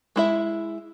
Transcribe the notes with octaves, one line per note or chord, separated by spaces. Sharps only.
G#3 E4 E5